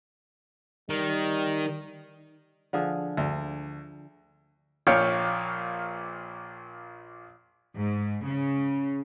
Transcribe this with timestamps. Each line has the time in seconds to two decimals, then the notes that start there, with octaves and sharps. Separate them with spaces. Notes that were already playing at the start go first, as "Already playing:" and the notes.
0.90 D#3 G3
2.73 D3 F3 G#4
3.17 D2
4.87 A#1 A#2 C#5 F5 G5 C#6
7.76 G#2
8.26 C#3